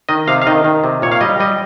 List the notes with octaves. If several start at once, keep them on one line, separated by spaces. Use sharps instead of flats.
D#3 D#5
C3 F5
F5
D#3 D#5
D#3
C3
A#2 C#5
F5
G3 D#5
G3 D#5